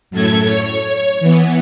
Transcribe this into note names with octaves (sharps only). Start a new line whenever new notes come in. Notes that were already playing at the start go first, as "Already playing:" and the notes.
F#2 A2 A3 G#6
C#5
E3 B3